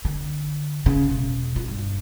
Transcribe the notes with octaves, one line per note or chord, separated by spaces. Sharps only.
D3
C#3
E1
F4
G2